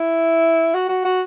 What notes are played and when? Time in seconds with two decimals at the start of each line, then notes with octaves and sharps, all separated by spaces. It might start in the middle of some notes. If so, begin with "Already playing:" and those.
Already playing: E4
0.74 F#4
0.89 F#4
1.05 F#4